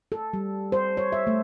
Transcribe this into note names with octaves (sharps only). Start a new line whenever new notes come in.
A4
G3
C5
C#5
E5
A3